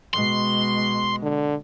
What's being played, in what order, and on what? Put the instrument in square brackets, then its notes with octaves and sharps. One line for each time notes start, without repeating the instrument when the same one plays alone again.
[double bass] B2 G#3 [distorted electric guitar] C6
[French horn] D3